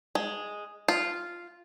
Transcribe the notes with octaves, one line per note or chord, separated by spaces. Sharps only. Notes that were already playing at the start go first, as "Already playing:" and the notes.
G#3
F4